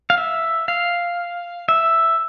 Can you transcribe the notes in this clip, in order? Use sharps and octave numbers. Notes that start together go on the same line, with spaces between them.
F5
E5
F5
E5